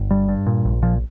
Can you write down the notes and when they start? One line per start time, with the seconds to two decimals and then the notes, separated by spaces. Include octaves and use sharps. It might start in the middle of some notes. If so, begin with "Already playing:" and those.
Already playing: G1
0.11 G2 G3
0.29 G2
0.46 A#2
0.65 A#1
0.82 A#2 F3